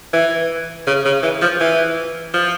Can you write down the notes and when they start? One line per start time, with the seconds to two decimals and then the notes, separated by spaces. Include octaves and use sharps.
0.13 E3
0.87 C#3
1.05 C#3
1.23 E3
1.42 F3
1.60 E3
2.34 F3